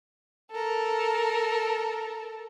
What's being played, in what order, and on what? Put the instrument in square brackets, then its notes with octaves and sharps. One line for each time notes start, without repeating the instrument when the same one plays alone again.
[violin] A4 A#4